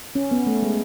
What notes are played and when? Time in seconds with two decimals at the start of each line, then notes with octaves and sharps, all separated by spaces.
0.15 C#4
0.31 B3
0.47 A3
0.63 G#3